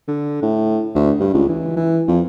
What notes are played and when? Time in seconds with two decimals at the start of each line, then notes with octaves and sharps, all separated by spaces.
0.08 D3
0.42 A2
0.95 D2
1.20 G2
1.34 C#2
1.49 E3
1.77 E3
2.08 F2